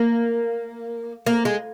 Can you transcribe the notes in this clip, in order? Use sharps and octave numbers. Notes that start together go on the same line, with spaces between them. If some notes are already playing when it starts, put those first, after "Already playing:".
Already playing: A#3
A#3
G#3